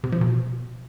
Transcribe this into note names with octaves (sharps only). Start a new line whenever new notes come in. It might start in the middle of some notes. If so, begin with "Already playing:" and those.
C3
F3
B2